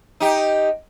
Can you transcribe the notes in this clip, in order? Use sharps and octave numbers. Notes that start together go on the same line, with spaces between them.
D#4 G4